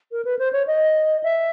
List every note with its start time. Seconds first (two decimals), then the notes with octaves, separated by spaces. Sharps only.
0.12 A#4
0.25 B4
0.39 C5
0.53 C#5
0.67 D#5
1.24 E5